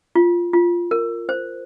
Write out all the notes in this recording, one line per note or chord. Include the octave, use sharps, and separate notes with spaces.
F4
F4
A#4
C5